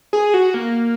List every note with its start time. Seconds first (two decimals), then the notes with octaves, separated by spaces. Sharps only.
0.13 G#4
0.34 F#4
0.54 A#3